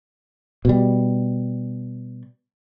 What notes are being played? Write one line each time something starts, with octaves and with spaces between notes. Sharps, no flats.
B2 G3